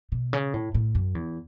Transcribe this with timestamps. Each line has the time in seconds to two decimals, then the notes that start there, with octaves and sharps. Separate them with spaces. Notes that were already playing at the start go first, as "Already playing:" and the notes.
0.12 B2
0.33 C#3
0.54 A2
0.74 A2
0.95 F#2
1.15 E2